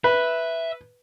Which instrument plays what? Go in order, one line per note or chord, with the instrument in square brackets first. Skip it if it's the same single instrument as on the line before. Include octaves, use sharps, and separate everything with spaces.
[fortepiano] B4 [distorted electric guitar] E5